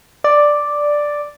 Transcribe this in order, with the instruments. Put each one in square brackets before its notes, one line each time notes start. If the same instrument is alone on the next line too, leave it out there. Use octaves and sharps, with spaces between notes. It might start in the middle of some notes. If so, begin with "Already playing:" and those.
[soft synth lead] D5